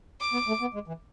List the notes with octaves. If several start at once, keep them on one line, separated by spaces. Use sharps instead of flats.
D6
B3
A3
B3
G#3
E3